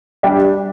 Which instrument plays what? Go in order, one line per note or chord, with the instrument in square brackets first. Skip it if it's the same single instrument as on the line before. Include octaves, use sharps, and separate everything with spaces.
[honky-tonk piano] G3 D4 G4